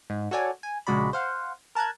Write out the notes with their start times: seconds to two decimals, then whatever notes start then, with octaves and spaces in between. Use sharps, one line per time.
0.10 G#2
0.31 F#4 A4 C#5 D5 G#5
0.63 G#5
0.87 A#1 C#3 G#3 F#4 D5 B5
1.13 C5 F5 F#5
1.75 A#4 A5 A#5 F#6 G#6